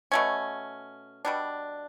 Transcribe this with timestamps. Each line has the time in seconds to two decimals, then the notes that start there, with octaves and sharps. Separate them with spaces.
0.12 B2 A3 C#4
1.25 B2 G3 D4